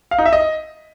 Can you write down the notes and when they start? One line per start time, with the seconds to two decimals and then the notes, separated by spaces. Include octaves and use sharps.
0.11 F5
0.18 D#4
0.26 E5
0.33 D#5